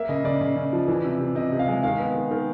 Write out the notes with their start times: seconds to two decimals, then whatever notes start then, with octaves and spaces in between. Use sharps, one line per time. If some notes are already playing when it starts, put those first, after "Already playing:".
Already playing: A#3 E5
0.09 C#3 D#5
0.24 C#3 D5
0.41 C#3
0.56 C#3
0.73 F3
0.88 E3
1.04 C3
1.19 C3
1.35 C3 D#5
1.52 C3
1.59 F5
1.68 G#3
1.83 D#3 F5
2.00 B3
2.15 D#3
2.31 D#3